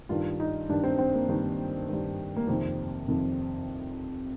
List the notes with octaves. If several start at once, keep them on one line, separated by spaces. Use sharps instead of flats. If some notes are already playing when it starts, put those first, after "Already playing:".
G2 D#3 F4
D#4
G2 D#3 D4
C4
C4
A#3
G2 D#3
G2 D#3
A#3
F2 C3 D#3 C4
F2 C3 D#3